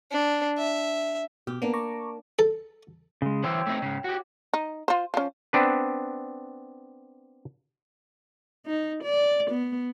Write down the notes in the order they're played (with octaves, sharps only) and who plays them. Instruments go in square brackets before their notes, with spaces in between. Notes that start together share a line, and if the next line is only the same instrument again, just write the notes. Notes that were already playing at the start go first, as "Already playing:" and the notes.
[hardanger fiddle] D4
E5
[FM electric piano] B2 [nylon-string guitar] G4
[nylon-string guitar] A#3 D4 [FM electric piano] B3
[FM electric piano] A#5 C#6 D6
[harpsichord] A4
[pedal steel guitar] C#3 G#3
[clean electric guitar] D3 E3 C5 [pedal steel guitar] C#5 G5 E6
[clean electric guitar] A3 C4 D#4
G#2 C#3
F#4 G4
[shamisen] D#4
F4 C5
F3 C#4
[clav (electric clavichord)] B3 C4 D4 B4
[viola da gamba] D#4
D5
B3